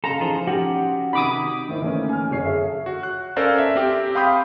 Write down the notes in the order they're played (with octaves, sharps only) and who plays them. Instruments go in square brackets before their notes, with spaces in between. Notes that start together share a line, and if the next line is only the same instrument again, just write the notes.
[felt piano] C#3 F5 C6 [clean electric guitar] A4 [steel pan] A#5
[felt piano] E3 F3 D#4 [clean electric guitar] F4 G#4 C5
[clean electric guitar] C#4 F#4 F#5 [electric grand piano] G4
[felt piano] C3 D#3 [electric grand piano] D#4 [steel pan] B5 D6 D#6
[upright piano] D#3 E4 C5
E3 A3 A#3 C#4
G#5 F6
F#1 C#5 C7
G#4 A4 E5
[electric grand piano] F#4
F#6
C#4 A4 A#4 C5 D5 F5
E5
C4 G4
F5 G5 B5 C6 D#6 G6